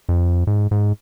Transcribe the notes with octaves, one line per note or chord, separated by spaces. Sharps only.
F2
G#2
G#2